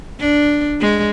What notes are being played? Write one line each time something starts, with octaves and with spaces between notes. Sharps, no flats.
D4
G#3